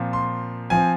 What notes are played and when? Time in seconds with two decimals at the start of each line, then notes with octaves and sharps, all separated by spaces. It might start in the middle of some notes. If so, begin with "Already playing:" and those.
Already playing: A#2 F3 C4
0.13 C6
0.70 F3 C4 G#5